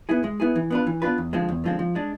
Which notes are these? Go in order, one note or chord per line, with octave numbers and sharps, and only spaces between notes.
B3 E4 G#4
G#3
B3 E4 G#4
E3
B3 D4 F4 B4
E3
B3 D4 F4 B4
E2
D3 F3 G#3 C4
E2
D3 F3 G#3 C4
F3
G#3 D4